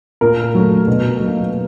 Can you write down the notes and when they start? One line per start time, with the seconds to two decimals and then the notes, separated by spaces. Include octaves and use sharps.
0.21 A#2 A#4
0.55 F#3 A3
0.87 B2
1.20 F#3 A#3